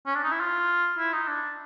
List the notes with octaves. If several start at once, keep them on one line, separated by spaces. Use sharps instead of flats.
C#4
D4
D#4
E4
F4
E4
D#4
D4